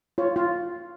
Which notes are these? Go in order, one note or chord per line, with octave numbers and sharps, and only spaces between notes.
F4 C#5
F4